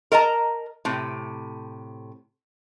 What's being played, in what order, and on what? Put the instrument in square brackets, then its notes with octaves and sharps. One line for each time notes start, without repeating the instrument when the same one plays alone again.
[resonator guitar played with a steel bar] A#4 D#5 A5 A#5
A2 C3